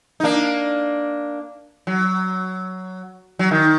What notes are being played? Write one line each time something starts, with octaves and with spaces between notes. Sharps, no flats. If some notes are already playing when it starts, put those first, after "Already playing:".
D#4
A#3 D4
F#3
F#3
D#3